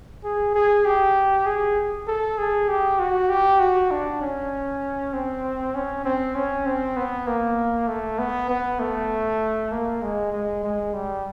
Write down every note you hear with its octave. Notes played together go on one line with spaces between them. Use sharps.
G#4
G#4
G4
G#4
A4
G#4
G4
F#4
G4
F#4
D4
C#4
C4
C#4
C4
C#4
C4
B3
A#3
A3
B3
B3
A3
A#3
G#3
G#3
G#3
G3